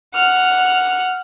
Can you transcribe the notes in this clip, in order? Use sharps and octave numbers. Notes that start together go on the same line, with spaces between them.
F#5 F6